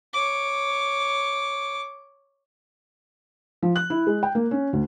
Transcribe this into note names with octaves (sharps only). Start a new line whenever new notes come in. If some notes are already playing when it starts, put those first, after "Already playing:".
C#5 D6
F3
F#6
E4
G#3
G5
A#3
C#4
D2